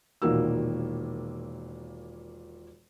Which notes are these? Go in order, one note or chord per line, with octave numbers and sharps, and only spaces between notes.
E1 A#2 D#3 A#3 F#4 E6